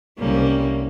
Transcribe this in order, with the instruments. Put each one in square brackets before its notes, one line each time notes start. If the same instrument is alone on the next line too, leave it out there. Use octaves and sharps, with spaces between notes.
[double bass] C2 C3 [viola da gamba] G3 A#3 C#4